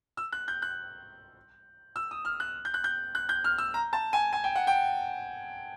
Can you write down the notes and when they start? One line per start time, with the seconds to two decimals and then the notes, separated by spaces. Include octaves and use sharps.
0.17 E6
0.32 F#6
0.48 G6
0.62 F#6
1.96 E6
2.11 D#6
2.25 F6
2.40 F#6
2.65 G6
2.74 F#6
2.84 G6
3.15 F#6
3.29 G6
3.44 F6
3.58 E6
3.74 A#5
3.93 A5
4.13 G#5
4.33 G#5
4.44 G5
4.55 F#5
4.67 G5